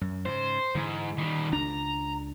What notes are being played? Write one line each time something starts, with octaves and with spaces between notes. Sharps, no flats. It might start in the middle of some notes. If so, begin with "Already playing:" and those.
F#2
G#2 C#3 C5
G#2 D3 E3
D#3 G3
C#2 D4 A#5